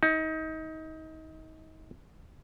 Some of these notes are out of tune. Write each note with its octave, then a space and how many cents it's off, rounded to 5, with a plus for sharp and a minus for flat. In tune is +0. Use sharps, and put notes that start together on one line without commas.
D#4 +30